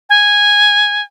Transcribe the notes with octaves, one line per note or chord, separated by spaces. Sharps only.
G#5